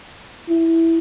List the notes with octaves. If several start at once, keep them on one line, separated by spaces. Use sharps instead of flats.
E4